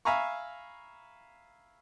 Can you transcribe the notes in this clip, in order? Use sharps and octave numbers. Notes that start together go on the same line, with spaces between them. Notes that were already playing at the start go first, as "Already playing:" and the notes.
E5 F5 G#5 A#5 B5 C#6